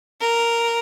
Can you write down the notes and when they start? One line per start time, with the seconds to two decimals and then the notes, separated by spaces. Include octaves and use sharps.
0.20 A#4